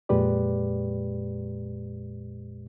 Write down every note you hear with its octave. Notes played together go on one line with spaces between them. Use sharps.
F2 A#2 G#3 G4 B4 D5